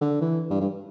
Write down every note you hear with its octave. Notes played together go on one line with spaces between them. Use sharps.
D3
E3
G2
G2